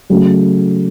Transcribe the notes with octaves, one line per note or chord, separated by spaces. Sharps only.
C#3 F#3 A3